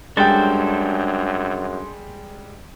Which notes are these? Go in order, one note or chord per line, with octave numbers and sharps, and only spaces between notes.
F#2 G3 G#3 D4 A4 C5 G5 A6